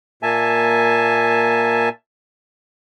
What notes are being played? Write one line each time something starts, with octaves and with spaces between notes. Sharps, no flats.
A#2 A#3 E5 G#5 A5